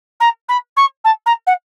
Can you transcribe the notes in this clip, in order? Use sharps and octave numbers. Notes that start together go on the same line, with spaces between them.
A#5
B5
C#6
A5
A#5
F#5